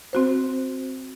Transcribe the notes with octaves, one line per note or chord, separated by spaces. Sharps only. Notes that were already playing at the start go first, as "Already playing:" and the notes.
C4 F#4 C5